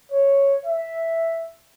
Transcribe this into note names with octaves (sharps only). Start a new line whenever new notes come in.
C#5
E5